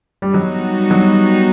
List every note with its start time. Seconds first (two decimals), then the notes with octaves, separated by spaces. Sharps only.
0.22 G3
0.34 F#3 G3 B3 D#4 F#4
0.91 F#3